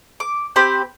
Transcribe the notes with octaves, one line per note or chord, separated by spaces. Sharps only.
D6
C4 G4 C5 B5